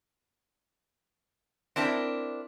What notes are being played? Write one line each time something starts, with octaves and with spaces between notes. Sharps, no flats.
C4 D4 E4 A#4